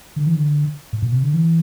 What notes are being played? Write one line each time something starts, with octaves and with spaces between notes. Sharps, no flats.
D3
E3
D3
A2
A#2
C3
D3
E3